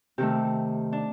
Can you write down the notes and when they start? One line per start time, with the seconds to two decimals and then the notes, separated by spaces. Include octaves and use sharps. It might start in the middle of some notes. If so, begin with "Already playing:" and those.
0.18 C3 D#3 A3 G4
0.93 D4